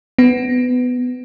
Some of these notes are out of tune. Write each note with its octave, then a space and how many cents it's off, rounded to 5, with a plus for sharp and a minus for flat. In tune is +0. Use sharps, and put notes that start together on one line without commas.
B3 +20